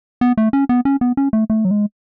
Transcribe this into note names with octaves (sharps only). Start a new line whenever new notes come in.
B3
A3
C#4
B3
C#4
B3
C#4
A3
A3
F#3
G#3